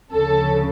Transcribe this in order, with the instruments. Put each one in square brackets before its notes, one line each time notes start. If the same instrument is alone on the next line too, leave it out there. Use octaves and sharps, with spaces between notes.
[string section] D2 C#3 F3 A4